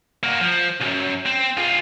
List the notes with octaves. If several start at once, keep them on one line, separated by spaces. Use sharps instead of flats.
A#3 F#4
F3
B1 F#2
C4
F4 G#4